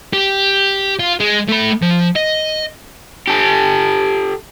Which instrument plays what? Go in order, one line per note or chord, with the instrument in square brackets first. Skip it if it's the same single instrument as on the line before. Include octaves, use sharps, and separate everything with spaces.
[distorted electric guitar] G4
F4
G#3
A3 B5
F3
D#5
[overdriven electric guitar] G4 A4